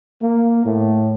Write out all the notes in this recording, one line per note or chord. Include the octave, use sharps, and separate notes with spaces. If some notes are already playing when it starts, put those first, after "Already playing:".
A#3
A2